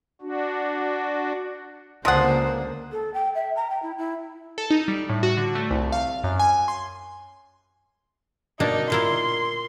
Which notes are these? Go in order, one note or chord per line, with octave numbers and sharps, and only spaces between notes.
D4 F#4
C#2 D3 F3 A#3 D4 G#4 C5 F#5
A4
G5
E5
A#5
G5
E4
E4
A4
D#4
G3
A2
F#4
D3
A3
C2
F5
F#2
G#5
C6
B2 A#3 D4 D#4
A#2 A#3 E4 C6